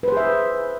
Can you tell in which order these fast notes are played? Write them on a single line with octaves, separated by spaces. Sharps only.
B4 C5 G#4 E5